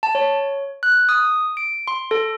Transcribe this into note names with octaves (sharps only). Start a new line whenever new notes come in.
A5
C#5
F#6
D#6
D7
C6
A4